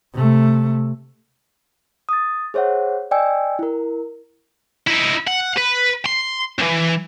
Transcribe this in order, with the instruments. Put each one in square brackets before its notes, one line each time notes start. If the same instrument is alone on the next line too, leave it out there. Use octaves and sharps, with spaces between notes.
[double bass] C3 A3
[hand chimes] D#6 A6
G#4 C5 C#5 E5 F#5
D5 D#5 G5 G#5 E6
E4 A#4
[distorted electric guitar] D#4 E4
F#5
B4
C6
C#2 E3